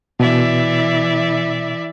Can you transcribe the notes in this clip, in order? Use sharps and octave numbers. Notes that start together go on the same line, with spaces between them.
B2 E3 D5 E5